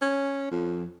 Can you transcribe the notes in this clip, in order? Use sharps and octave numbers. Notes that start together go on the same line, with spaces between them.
C#4
F2